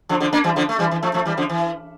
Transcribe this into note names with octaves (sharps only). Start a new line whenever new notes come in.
D3 F3
D3 F3
A#3 D4
E3 G3
D3 F3
A3
E3 G3
E3
F3 A3
F3 A3
E3 G3
D3 F3
E3